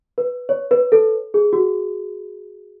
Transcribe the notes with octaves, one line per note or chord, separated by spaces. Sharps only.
B4
C#5
B4
A4
G#4
F#4